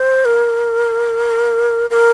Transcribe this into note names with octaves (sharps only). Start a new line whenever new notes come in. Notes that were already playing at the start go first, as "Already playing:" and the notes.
Already playing: C5
A#4
A#4